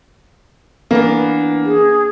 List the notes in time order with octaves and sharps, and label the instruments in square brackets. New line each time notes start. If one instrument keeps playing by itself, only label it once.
[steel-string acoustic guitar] E3 B3 D4 [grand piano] A#3
[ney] G#4